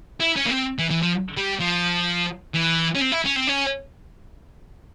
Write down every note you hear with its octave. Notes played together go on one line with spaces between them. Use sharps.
E4
C#4
A#3
C4
E3
E3
F3
G3
F3
E3
C#4
C4
E4
C#4
C4
C#4